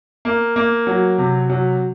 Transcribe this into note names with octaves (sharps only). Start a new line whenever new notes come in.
A#3
A#3
F#3
C3
F#3